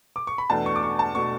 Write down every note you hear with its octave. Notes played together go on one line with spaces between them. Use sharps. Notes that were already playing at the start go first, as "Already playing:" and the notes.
D6
C#6
B5
E2 B2 A3 D4 A5
C#6
D6
C#6
A5
B2 A3 D4 C#6